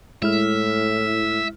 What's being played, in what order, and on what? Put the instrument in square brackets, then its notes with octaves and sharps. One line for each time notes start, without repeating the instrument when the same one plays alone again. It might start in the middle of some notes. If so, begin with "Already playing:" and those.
[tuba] A2 [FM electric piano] G#3 E4 F6 [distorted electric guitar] E5